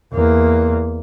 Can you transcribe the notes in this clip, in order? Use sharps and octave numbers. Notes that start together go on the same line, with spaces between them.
E2 A#3